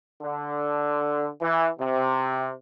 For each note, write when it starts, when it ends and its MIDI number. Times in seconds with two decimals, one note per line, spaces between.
0.22 1.27 50
1.41 1.68 52
1.80 2.50 48